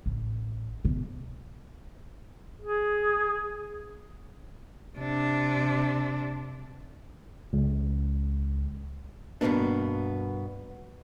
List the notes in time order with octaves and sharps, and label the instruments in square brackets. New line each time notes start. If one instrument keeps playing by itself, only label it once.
[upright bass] A1
B2
[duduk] G#4
[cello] C3 D4
[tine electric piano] C#2
[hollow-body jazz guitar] G2 B2 D#3 A#3 B3 D4